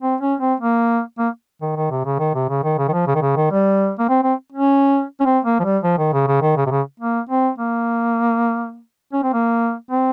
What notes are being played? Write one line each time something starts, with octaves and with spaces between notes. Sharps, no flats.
C4
C#4
C4
A#3
A#3
D#3
D#3
C3
C#3
D#3
C3
C#3
D#3
C#3
D#3
F3
C#3
D#3
C#3
D#3
G3
A#3
C4
C4
C#4
C#4
C4
A#3
F3
G3
F3
D#3
C#3
C#3
D#3
C#3
C3
C#3
A#3
C4
A#3
C#4
C4
A#3
C4